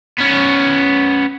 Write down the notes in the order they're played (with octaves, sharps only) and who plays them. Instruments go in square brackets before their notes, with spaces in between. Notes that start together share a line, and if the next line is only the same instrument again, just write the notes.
[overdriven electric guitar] B3 C#4